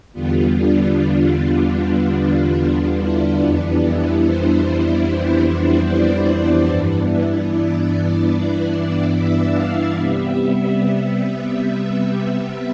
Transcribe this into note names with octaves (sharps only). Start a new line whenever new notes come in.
E2 D3 G3 B3 F4
D4
D4
E4
F2 E3 G3 B3 D4
E4
C5
D5
E4
G2 E3 B3 D4
E4
D5
E5
F5
C3 G3 B3 E5